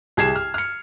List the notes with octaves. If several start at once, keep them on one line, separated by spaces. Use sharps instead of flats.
C2 G#4 G#6 C7 E7
F6
F6 C#7